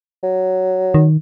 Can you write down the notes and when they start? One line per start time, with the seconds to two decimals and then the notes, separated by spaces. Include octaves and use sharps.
0.23 F#3
0.94 D#3